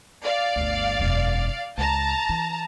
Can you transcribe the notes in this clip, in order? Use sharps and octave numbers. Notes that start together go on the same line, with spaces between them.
D5 F5
G1 D2
E1 F#2
C#2 A5 A#5
E3